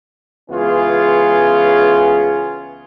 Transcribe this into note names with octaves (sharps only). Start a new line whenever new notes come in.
C#2 E3 B3 C#4 F4 G#4